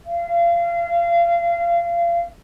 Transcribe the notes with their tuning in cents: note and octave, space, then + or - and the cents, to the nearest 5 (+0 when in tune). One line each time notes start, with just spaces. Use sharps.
F5 -30